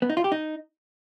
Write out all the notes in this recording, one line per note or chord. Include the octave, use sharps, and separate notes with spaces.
B3
D#4
F4
G4
D#4